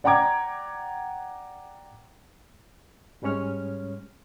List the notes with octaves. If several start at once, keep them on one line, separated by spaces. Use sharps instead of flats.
D5 F#5 G5 A#5 D6 G#6
G#2 G3 G#3 C#4 C#5 F6